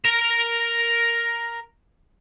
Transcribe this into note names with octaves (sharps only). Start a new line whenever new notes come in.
A#4 A#5